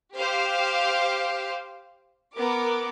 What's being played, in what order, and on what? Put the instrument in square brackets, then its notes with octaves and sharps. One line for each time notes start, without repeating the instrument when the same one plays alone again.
[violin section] G4 C5 F5
B3 A#4 D6